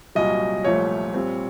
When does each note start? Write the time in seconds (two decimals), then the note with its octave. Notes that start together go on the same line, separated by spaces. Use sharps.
0.15 C2 A#2 F#3 D#5
0.64 C2 A#2 F3 A3 C#5
1.14 A#2 G3 C4